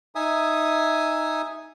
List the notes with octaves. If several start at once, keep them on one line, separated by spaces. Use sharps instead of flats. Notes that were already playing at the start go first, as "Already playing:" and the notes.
D#4 E5 G#5 D#6